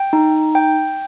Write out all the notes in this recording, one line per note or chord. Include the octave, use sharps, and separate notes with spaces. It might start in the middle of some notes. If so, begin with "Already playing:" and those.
Already playing: G5
D#4
G5